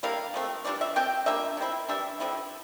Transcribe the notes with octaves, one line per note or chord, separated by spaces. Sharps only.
D3 G3 A#3 E4 F5
F3 A3 C4
E3 G3 D4 F4 D5
E5
F3 C4 G5
G3 A#3 D4 F4 E5
C3 F3 C4 E4
E3 G3 D4 E5
D3 F3 C4 E4